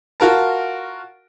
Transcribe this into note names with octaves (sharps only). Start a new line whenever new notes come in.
F4 F#4 A#4 A5